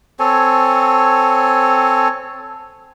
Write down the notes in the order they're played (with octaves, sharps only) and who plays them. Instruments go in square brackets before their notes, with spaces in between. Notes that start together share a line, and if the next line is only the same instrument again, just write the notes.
[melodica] C4 A4 C#5 G#5